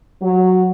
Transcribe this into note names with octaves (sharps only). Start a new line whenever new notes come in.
F#3